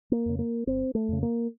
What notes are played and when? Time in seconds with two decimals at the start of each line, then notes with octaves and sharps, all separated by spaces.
0.12 A#3
0.26 F2 C#3
0.39 A#3
0.67 G1 C4
0.95 A3
1.08 F2 C#3
1.23 A#3